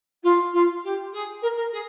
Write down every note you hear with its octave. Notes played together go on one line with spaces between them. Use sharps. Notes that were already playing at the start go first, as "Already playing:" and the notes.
F4
F4
G4
G#4
A#4
A#4
G#4